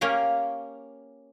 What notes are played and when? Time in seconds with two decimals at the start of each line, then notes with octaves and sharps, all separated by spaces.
0.01 A#3 C#4 G4 F5